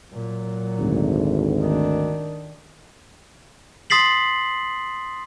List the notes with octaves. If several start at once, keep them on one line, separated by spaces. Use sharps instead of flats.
A#2 F#3
G#1 D2
D#3 D4
C6 D#6 A6 B6 C7 F#7